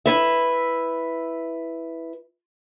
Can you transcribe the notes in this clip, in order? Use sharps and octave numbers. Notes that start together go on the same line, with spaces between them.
E4 B4 E5